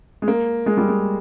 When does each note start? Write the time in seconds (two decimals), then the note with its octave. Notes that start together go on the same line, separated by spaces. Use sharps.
0.22 G#3
0.28 A#3
0.66 G#3
0.77 G3
0.89 G#3